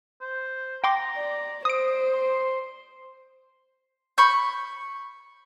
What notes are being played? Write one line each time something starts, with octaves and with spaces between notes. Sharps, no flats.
C5
G5 A#5 C6 D6
D5
C5 D#6 D7
C6
B5 C#6 G6